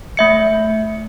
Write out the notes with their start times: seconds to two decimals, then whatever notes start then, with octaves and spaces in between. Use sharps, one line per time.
0.17 A3 E5 C#7